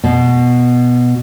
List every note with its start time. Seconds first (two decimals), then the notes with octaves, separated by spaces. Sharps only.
0.04 B2